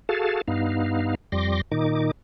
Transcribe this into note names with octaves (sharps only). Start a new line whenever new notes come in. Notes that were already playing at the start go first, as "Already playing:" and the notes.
F#4 G#4 A4 F5 A5
G2 B3 D#4 F5
F2 G3 C6 D6 A#6
A#2 D#3 D#4 D6